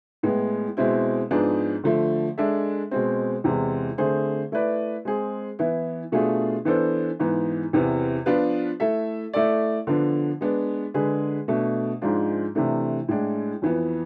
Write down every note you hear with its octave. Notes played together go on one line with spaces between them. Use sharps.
A2 G#3 B3
B2 G#3 C4 E4
G#2 F3 B3 D4 G#4
D3 F3 A3
G#3 D4 A4 E5
B2 G#3 C4
E2 C3 G#3
D3 A3 C4 G#4 C5
A3 E4 B4 D5
G#3 C4 G#4
E3 B3 E4
B2 A3 D4 F4 G#4
E3 B3 D4 A4 C5
G#2 E3 B3
E2 C3 E3 B3
F3 B3 D4 F4 B4
A3 E4 A4 E5
A3 E4 A4 D5
D3 F3 B3 D4
G#3 B3 D4
D3 G#3 D4 G#4 B4
B2 A3 D4
G#2 F3 G#3 D4 F4
C3 E3 A3 D4
A2 G#3 D4
F2 E3 B3